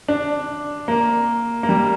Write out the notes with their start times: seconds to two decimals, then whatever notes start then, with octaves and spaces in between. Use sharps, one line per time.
0.08 D4
0.88 A#3
1.63 A#3
1.69 G3